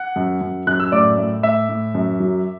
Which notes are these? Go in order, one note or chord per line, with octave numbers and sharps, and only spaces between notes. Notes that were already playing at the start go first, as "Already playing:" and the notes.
Already playing: F#5 F#6
F#2
F#2
F#2 F#6
E6
A2 D5 D6
A2
A2 E5 E6
A2
F#2
F#3